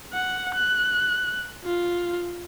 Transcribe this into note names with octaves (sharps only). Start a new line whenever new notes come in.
F#5
F#6
F4